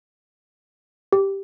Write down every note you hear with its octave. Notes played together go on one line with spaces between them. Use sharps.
G4